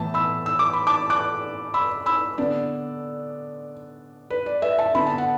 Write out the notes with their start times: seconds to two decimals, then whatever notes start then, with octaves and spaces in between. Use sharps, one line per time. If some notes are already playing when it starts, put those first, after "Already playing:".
Already playing: A2 E3 B3 E4 A5
0.14 B5 E6
0.46 E6
0.59 D6
0.73 B5
0.87 A5 D6
1.10 D6 F#6
1.74 B5 E6
2.06 B5 E6
2.38 D3 B3 D4 D5
4.30 B4
4.46 D5
4.62 B4 E5
4.78 E5 A5
4.95 D3 B3 E4 B5
5.07 A5
5.18 F#5